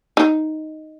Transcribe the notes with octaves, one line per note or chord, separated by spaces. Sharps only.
D#4